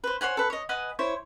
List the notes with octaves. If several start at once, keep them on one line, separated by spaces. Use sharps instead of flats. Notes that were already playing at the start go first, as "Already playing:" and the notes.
B4 C5
C5 C#5 F#5 G#5
A4 B4
C#5 D#5
B4 D#5 F#5 G#5
E4 C5 C#5